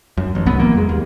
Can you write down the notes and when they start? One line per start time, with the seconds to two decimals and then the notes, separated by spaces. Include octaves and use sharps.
0.17 F#2
0.35 A1
0.46 C2 F#3 B3
0.59 E3 F#3 A#3
0.75 F2 G#3
0.89 D#2